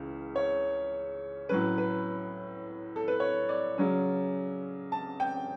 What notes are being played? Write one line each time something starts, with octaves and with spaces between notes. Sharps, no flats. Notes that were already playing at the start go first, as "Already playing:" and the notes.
Already playing: C#2 C#3 E3
C#5
A2 F#3 C#4 B4
B4
A4
B4
C#5
D5
C#3 F#3 C#4
A5
G5